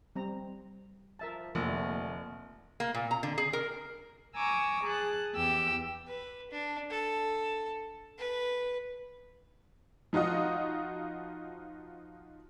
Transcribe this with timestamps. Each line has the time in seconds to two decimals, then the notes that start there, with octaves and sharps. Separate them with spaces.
0.16 G3 C4 A#5
1.19 F3 A#4 E5 A5
1.55 F1 D3 F3 A3 A#3 G#5
2.80 A#3
2.95 A#2
3.11 A#5
3.23 D3
3.38 G#4
3.53 A#4
4.35 G#5 A#5 C#6 D6 E6
4.84 G#4 A5 F#6
5.34 E2 G4 E6
6.07 B4
6.51 D4
6.90 A4
8.18 B4
10.13 F3 D#4 F4 F#4 D#5